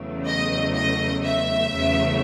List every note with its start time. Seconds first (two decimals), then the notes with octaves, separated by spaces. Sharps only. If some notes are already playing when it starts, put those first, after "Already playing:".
Already playing: E2 C#3 F#3 A3
0.26 D#5
0.75 D#5
1.24 E5
1.74 E2 C#3 F#3 A3